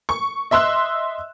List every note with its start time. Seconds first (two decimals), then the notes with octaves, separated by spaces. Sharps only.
0.09 C#6
0.51 D#5 E5 C6 E6 F#6